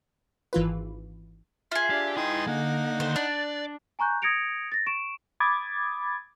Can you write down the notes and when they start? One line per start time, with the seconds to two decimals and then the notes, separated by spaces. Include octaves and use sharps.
0.53 G#1 E3 F4 B4
1.72 F4 G#4 E5
1.90 D4 G4
2.17 D#4 E4 B4 G5 C6 D#6
2.47 D3 A#3 D#4 F#5
3.00 D#2 A#3 C5
3.16 D4 D5 F#6
3.99 G#5 A#5 C#6 F#6 G6
4.22 D#6 G#6 A#6 C#7 D7 F7
4.72 A6 A#6
4.86 C#6 D7 E7
5.40 B5 D6 D#6 G#6 A6